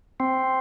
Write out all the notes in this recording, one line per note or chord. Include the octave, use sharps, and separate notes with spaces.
C4